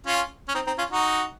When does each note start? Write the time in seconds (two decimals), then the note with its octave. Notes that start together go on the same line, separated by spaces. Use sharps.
0.06 C#4 F4
0.49 C#4
0.55 C4 D#4
0.67 C4 D#4
0.78 C#4 F4
0.91 D#4 F#4